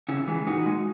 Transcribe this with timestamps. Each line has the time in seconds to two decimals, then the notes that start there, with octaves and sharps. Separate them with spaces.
0.08 C#3 C#4 E4
0.28 E3 G#3
0.47 A#2 D#4 F#4
0.66 G#3